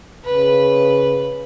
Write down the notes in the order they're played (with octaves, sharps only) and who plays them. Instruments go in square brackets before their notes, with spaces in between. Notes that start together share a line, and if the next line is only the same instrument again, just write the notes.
[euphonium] C#3 [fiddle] B4